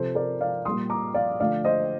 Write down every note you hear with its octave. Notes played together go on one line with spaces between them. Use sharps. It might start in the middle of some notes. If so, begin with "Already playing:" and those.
Already playing: C3 F3 C4 A4 C5
A#4 D5
D5 F5
A#2 G3 A#3 C6 D#6
A#5 D6
D5 F5
D3 F3 A3 D5 F5
C5 D#5